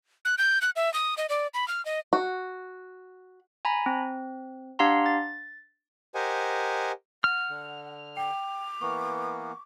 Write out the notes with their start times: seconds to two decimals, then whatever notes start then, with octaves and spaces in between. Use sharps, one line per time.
0.25 F#6
0.38 G6
0.62 F#6
0.76 E5
0.94 D#6
1.17 D#5
1.29 D5
1.54 B5
1.68 F6
1.85 D#5
2.13 F#4
3.65 G#5 A#5 B5
3.86 C4
4.79 D4 G4 F5 F#5 A#5 C6
5.06 A6
6.15 G4 A#4 C5 D#5 F#5 G#5
7.24 F#5 F6
7.49 D3
8.17 G5 D6
8.81 E3 A#3 B3 C#6